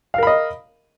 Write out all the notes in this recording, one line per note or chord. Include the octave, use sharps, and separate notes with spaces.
A#4 D#5 F5 B5